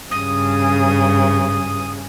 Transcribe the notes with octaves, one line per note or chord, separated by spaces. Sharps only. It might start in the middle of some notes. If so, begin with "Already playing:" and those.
G2 C#3 D#6